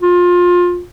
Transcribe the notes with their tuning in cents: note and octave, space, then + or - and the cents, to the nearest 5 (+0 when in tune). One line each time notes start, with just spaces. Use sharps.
F4 +20